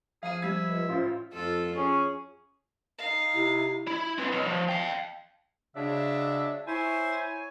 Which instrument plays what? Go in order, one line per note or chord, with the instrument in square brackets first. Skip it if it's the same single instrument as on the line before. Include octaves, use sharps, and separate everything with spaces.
[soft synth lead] F3 [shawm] G#4 [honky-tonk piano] F5 D#7
[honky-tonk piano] G3 G#6 [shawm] E5
[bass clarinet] C#2
[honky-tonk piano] A1 C5 [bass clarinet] F4
[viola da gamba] F2 F4 A4
[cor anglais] C#4 [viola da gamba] G#4
[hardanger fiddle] D#4 F5
[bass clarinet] C3 [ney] E4
[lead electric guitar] E4
C4 B4
B1
F3
F5 G5
[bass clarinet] C#3 [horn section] F#3 G#3 D4 [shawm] E5
[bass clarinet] E4 [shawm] C5 [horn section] C#5 G#5